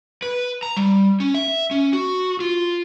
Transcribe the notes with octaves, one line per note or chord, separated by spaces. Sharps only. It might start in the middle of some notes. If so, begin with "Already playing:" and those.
B4
A#5
G3
C#4
E5
C#4
F#4
F4